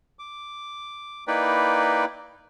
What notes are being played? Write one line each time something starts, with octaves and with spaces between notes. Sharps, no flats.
D6
A#3 D#4 E4 B4 D5 G5